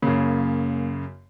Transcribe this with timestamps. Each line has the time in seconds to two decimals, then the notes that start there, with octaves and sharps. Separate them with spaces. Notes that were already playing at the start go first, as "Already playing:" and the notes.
0.02 F#2 C#3 A#3